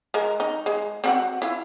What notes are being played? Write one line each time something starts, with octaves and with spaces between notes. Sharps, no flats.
G#3 A#4
D#4
G#3
C4 F#4 F#5
E4 F4